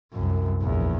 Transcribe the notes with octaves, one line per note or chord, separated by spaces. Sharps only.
C2 F#2
A#1 E2